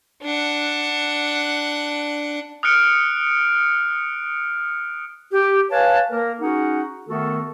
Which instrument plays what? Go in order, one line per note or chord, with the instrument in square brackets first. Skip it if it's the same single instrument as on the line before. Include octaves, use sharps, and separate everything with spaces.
[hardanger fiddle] D4 F#5
[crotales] D#6 F6 F#6 C#7 D7
[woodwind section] G4
B4 C#5 F5 G#5 A5
A#3 A#4
C#4 D#4 F#4 G#4 F#5
D#3 A3 B3 F#4 A4